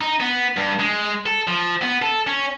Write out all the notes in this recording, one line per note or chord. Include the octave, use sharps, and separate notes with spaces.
D#4
B3
G2
G#3
A4
F3
B3
A4
C#4